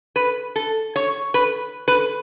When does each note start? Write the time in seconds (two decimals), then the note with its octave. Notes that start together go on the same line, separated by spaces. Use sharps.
0.16 B4
0.56 A4
0.96 C#5
1.34 B4
1.88 B4